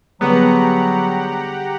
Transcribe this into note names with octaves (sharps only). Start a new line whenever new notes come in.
D3 F#3 G3 B3 G4 G#4 F#5 A#5